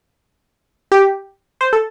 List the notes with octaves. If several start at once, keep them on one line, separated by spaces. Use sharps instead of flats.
G4
C5
A4